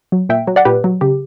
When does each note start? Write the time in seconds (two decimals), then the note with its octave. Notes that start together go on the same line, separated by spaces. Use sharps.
0.12 F#3
0.29 A#2 E5 G5
0.47 F#3
0.56 D5 F#5
0.65 A#2 G4 B4
0.84 F#3
1.01 C#3 G4